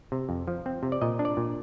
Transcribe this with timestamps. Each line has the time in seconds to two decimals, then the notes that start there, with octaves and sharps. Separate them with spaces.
0.12 C3
0.29 F2
0.48 F3
0.66 C4
0.83 C3
0.92 D5
1.02 A#2 D#5
1.19 D4
1.25 D5
1.37 A#2